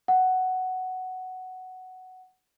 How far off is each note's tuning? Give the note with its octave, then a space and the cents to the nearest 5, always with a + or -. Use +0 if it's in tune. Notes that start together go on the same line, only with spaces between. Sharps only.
F#5 +5